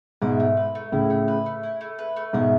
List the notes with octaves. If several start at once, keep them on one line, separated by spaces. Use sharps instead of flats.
G#2 B2 E4
A3
B4
A3
A2 C#3 E4
A3
B4
A3
E4
A3
B4
A3
G#2 B2 E4